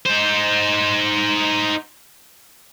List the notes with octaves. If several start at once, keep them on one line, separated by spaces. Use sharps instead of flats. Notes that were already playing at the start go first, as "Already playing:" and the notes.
D#4 C5